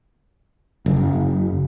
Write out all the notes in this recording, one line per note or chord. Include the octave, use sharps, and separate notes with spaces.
F#1